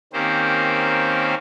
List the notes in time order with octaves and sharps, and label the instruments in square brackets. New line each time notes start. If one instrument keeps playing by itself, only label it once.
[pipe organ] D#3 A#3 C4 C#4 G4 C5